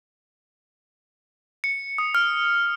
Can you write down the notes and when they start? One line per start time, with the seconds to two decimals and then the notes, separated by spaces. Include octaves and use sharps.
1.64 C#7
1.98 D#6
2.15 F6